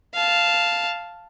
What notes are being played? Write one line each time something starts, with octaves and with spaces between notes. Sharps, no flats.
F5 A5